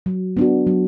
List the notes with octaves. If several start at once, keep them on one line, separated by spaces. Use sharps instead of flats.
F#3
B3 D4 F#4
F#3